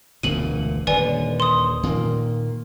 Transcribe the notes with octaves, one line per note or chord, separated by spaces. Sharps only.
E1 D2 A#2 D#7 F#7
D#1 D3 B4 D5 G#5
C6 D#6
A#2 D#3 A#3